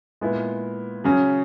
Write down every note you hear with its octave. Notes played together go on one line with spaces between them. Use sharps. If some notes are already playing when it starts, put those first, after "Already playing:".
A#2 G#3 B3 E4
C#3 F#3 C#4